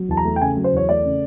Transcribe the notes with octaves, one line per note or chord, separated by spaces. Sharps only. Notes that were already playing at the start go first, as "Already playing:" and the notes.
Already playing: F#3
E2 A5
A#5
A3
G5
C#3 G#5
F#3
C5
E2 C#5
A3 D5
C#3